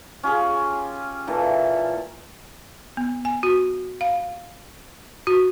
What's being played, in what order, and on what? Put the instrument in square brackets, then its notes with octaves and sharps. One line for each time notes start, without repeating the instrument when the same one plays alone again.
[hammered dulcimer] C#4 F4 G4 G#4
A#2 E3 A4
[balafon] B3
G#5
F#4
F5
F#4